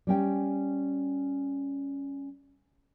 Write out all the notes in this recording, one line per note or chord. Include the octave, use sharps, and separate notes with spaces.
G3 C#4 G5